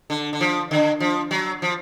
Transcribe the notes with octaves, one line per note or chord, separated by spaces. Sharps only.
D3
D3
F3
D3
F3
F#3
F3